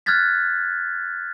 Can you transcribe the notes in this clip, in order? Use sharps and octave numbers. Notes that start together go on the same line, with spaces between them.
F6 F#6 G#6 A6 B6